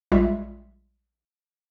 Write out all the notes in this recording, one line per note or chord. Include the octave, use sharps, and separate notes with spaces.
A#1 G3 G#3 F4 E5